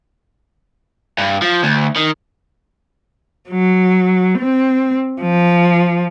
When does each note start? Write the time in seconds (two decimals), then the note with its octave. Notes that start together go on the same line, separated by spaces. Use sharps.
1.18 G2
1.42 F3
1.63 D2
1.96 D#3
3.48 F#3
4.39 C4
5.22 F3